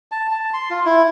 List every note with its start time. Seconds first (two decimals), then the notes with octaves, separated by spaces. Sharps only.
0.12 A5
0.31 A5
0.53 C6
0.70 F4
0.85 E4